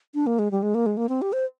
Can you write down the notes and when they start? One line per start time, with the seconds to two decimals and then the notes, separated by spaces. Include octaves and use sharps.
0.15 D4
0.27 A#3
0.39 G#3
0.51 G3
0.63 G#3
0.75 A#3
0.86 G#3
0.97 A#3
1.09 C4
1.22 G4
1.33 C5